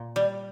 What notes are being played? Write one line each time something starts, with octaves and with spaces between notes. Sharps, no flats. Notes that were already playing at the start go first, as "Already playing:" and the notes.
Already playing: A#2
G3 D5